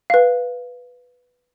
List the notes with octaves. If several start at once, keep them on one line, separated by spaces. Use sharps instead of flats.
B4 F5